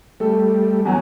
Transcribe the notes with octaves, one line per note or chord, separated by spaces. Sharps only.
G3 A3 A4
E2 F#3